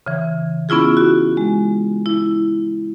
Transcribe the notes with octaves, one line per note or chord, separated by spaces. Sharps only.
C#3 E3
B3 C#4 E4 F4 G#4
F#4
G#3
E4